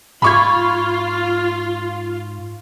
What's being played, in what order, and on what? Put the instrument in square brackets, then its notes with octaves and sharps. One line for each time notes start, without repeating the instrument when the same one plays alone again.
[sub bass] G#2 [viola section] F4 [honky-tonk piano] B5 C#6 G#6